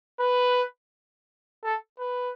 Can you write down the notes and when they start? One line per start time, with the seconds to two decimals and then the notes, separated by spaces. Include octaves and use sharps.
0.20 B4
1.64 A4
1.99 B4